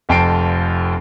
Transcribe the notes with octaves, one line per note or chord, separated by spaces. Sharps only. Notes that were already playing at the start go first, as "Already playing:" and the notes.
F1 F2 G5 A5 C7 D7